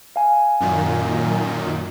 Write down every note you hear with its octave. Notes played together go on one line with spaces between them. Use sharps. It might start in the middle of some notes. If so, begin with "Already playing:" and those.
F5 G#5
F#2 A#2 D#3